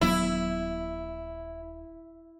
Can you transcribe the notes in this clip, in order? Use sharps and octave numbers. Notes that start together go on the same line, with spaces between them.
D#1 F#3 B3 E4